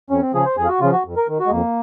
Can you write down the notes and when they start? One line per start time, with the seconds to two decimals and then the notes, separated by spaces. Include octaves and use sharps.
0.10 F2 C#4
0.21 C4
0.34 C#3 F3 G#4
0.46 C5
0.57 F2 G#4
0.65 F4
0.69 F#4
0.80 C#3 F3 F4
0.93 F#4
1.05 F2
1.17 A#4
1.28 D#3
1.40 F#4
1.47 G#3
1.51 F2 A#3